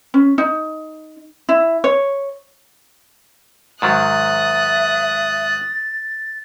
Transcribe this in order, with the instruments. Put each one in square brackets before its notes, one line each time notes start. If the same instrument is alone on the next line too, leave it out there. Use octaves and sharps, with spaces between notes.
[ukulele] C#4
D#4
E4
C#5
[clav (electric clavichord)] G#2 D#3 F#3 [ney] E5 [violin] D#6 F#6 [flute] A6